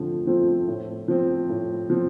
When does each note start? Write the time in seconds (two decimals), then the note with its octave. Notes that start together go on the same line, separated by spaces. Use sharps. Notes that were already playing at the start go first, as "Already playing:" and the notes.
Already playing: D3 F3 A3 C4
0.27 F3 A3 C4 F4
0.68 A2
1.08 F3 C4
1.49 A2
1.90 F3 C4